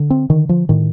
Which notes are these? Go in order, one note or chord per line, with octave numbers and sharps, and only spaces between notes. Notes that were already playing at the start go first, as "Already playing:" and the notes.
Already playing: D3
C4
D3 D#3
F3
A2 D#3